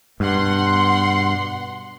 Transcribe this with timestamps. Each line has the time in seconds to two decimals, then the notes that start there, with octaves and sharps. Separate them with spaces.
0.20 G2 B2 F#5 C6